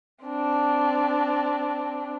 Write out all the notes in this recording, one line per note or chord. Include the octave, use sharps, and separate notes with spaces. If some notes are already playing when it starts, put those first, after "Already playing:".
C4 D4